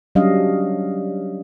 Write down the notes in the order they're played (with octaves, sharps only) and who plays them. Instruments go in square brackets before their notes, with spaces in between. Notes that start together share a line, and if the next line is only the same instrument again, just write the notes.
[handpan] F#3 G3 C#4 D4 D#5 F5